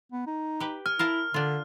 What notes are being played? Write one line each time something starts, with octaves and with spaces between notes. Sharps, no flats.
B3
D#4
G4 B4
G#5 F6
E4 A#4 F5 A5
D3 D4 F4